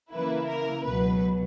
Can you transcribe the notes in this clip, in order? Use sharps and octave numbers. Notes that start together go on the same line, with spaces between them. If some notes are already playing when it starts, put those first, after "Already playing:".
C#3 E3 A#3 E4 B4
A#4
C#2 B2 F#3 B4